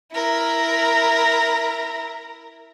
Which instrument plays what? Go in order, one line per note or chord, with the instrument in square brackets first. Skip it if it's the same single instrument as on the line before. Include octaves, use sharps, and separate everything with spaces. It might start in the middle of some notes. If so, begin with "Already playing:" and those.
[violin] E4 A#4